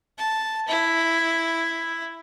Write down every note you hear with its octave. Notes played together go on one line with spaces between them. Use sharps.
A5
E4